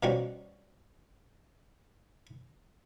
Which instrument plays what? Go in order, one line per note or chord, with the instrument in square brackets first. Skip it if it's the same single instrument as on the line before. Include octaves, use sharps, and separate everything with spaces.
[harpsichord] B2 F3 G3 C#4 F#4